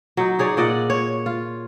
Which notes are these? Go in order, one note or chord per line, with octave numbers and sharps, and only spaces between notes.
F#3 D#4
D#4 G#4 C#5 D5
A#2 D5 D#5 F#5
C#5
F4